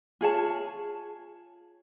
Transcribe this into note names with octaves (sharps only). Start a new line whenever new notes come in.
F4 G#4 C#5 A5